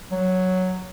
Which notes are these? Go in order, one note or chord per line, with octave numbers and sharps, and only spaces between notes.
F#3